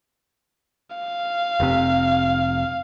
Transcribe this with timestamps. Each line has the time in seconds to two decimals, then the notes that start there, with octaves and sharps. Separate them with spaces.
0.96 F5
1.60 F1 C3